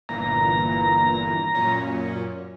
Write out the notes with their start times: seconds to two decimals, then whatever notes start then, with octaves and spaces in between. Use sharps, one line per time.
0.09 G1 A#2 E3 A#5
1.55 F#2 A#2 C#4